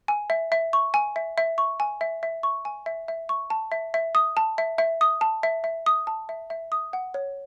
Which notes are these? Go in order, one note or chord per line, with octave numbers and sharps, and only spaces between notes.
G#5
E5
E5
C#6
G#5
E5
E5
C#6
G#5
E5
E5
C#6
G#5
E5
E5
C#6
A5
E5
E5
D#6
A5
E5
E5
D#6
A5
E5
E5
D#6
A5
E5
E5
D#6
F#5
C#5